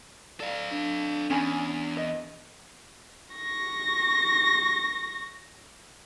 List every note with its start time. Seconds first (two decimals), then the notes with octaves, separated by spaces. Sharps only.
0.40 A4 D5 F5
0.71 D4
1.30 E2 C#4 G#5 B5
1.97 D#5
3.36 C#6 A#6